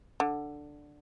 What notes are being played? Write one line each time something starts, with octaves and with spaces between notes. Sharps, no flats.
D3